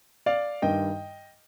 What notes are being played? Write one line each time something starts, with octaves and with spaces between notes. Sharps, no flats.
D5 F5
G2 D#3 G3 D#5 G5